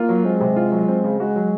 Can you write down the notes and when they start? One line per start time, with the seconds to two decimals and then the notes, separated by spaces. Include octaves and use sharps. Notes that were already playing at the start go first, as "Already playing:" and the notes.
Already playing: A#3 F4
0.09 F#3
0.25 G#3 C4
0.41 C3
0.56 F4
0.72 F#3
0.88 C4
1.04 C#3
1.19 G#3 F#4
1.36 F#3